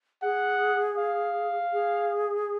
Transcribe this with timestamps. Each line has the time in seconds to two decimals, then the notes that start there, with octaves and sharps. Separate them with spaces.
0.23 G#4 F#5
0.98 F5
1.73 G#4